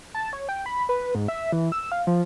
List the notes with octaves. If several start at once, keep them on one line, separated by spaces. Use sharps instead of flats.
A5
C#5
G5
B5
B4
G#2
E5
E3
E6
F5
F3